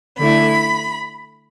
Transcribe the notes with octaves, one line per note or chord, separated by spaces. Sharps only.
D3 A3 E4 B5